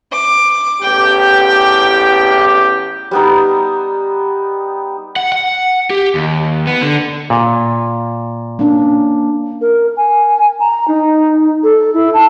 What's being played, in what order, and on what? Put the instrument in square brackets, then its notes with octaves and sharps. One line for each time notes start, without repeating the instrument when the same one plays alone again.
[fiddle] D6
[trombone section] A1 E2 G4 [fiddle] G5
[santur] G3 B3 D#4
[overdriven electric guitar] F#5
F#5
G4
D#2
B3
D3
[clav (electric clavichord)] A#2
[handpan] A#3 C#4 D4
[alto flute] A#4
G#5
A#5
D#4
A4
E4
A5